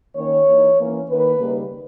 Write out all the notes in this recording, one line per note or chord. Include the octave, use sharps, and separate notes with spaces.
D#3 A#3 C#4 C#5
E3 A#3 D#4
E3 A#3 C#4
D#3 A#3 D#4 B4
C#3 G3 A#3 D#4